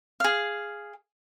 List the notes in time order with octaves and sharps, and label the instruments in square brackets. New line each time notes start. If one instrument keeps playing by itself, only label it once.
[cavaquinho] G#4 F5